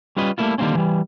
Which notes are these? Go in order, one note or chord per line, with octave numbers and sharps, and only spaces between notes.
G3 C#4 F4 B4 D#5
G3 A3 A#3 E4 F4
D3 D#3 G3 A#3 C4 C#4
E3 G3